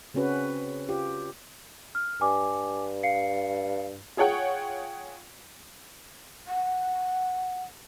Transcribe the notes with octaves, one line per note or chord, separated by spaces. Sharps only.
C#3 C4 C#4 F#4 B4
F4 G4
F6
G2 G#5 D6
F5 C7 C#7
F4 G#4 C#5 F#5 G5
F#5